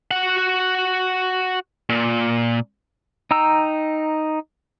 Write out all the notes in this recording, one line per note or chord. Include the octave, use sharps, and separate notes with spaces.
F#4 F#5
A#2
D#4 G5 A#5 E6